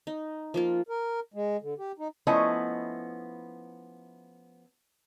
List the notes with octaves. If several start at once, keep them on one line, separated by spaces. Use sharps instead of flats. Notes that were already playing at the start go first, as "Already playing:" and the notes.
D#4
F3 A#3 F4
A#4
G#3
D3
G4
D#4
F3 A3 B3 C#4 E4 D#5